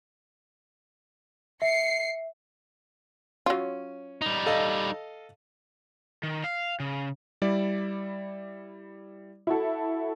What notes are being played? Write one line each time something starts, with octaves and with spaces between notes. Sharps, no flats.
E5 C7 C#7
F#3 C#4 F4
G3 D#4
A4 D#5 F5
D#3
F5
C#3
G3 E4 D5
E4 F#4 A4